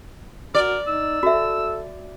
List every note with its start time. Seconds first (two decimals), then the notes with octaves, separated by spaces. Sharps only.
0.55 F#4 A#4 D5
0.87 D#4 E6
1.23 F#4 A4 E5